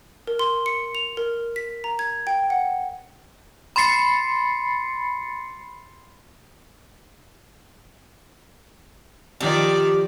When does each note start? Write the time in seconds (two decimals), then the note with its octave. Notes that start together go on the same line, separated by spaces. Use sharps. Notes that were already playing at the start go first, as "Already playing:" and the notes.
0.27 A#4
0.39 C6
0.66 C#7
0.95 F7
1.17 A#4
1.56 B6
1.84 A#5
1.99 G#6
2.27 G5
2.50 F#5
3.76 B5 C6 A6 C7 C#7
9.41 D#3 F3 G4 D5